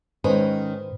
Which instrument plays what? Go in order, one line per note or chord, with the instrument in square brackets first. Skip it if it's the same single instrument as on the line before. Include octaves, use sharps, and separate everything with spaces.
[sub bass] G#2 [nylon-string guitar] D#3 G#3 C#4 [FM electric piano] B4 C5 D#5